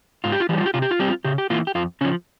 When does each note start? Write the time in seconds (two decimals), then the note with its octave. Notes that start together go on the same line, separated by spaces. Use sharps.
0.24 G#2 F4
0.32 G4
0.40 F4
0.49 E3 G4
0.53 G3
0.58 F4
0.66 G4
0.74 C3 F4
0.82 G4
0.91 F4
0.99 G3 C4 G4
1.08 F4
1.25 C#3 G4
1.38 G4
1.50 E3 A#3 F4
1.67 G4
1.75 F2 F4
2.01 C#3 C#4
2.04 F3